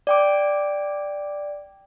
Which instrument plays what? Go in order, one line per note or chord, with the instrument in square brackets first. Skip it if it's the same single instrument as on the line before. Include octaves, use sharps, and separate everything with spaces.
[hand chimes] D5 G5 D6